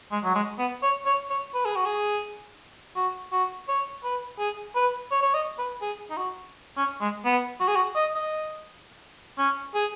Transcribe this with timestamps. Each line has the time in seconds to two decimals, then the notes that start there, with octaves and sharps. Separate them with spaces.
0.11 G#3
0.24 F#3
0.35 G#3
0.59 B3
0.83 C#5
1.06 C#5
1.30 C#5
1.54 B4
1.65 G#4
1.76 F#4
1.86 G#4
2.96 F#4
3.32 F#4
3.68 C#5
4.04 B4
4.39 G#4
4.75 B4
5.11 C#5
5.23 C#5
5.34 D#5
5.59 B4
5.82 G#4
6.10 D#4
6.17 F#4
6.77 C#4
7.01 G#3
7.25 B3
7.60 F#4
7.68 G#4
7.76 F#4
7.95 D#5
8.15 D#5
9.38 C#4
9.75 G#4